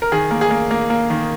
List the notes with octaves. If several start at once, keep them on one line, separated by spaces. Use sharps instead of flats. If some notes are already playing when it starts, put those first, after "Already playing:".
A#4
D#3 G#4
A#3
G#4
A#3
A#3
A#3
D#3